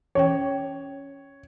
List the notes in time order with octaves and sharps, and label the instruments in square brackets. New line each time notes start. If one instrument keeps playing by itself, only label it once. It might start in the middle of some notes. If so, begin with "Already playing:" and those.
[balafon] E3 C#4 G5 [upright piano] C#5